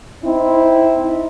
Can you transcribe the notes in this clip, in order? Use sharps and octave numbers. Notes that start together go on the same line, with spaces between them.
C4 D#4 E4